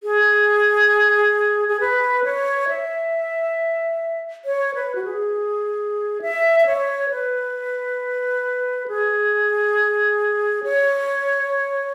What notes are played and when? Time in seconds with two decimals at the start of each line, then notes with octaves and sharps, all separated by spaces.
0.03 G#4
1.69 G#4
1.80 B4
2.24 C#5
2.68 E5
4.45 C#5
4.75 B4
4.95 F#4
5.04 G#4
6.22 E5
6.60 E5
6.66 C#5
7.10 B4
8.88 G#4
10.64 C#5